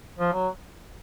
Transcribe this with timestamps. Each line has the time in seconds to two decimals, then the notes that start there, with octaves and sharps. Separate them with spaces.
0.19 F3
0.33 F#3